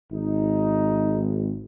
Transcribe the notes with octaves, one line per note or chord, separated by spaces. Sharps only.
G#1 D#4